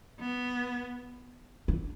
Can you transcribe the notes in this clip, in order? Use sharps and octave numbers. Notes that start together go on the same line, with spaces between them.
B3
D4